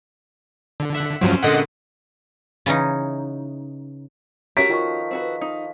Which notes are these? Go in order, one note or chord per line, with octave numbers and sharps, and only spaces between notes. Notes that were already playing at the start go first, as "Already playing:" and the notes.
D3
E5 F#5
G2 F3 F#3 C4 C#4
A#2 D3 G#3 D#5 F#5
C#3 E3 C#4 D#4
C#4 F#4 G4 A4 A#4 A#5 B6 D7
D#3 F3 F4 D#5 F5 C#6
C4 F#4 B4
D#4